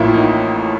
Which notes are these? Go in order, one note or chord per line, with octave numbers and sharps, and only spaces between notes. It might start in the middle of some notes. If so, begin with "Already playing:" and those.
Already playing: A1 A2 F3 A#3 E4 F4
D#4